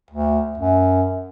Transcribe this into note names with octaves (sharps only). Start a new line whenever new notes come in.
D2
F#2